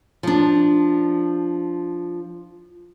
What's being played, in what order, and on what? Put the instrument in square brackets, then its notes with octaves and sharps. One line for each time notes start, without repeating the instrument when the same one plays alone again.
[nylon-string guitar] F3 D4